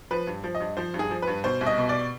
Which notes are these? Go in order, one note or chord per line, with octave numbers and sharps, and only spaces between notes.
F3 B4
G2
F3
D#5
G2
F3 C5
G2
G#4
F3
G2 B4
B2 C5
C2
D#5
B2
D5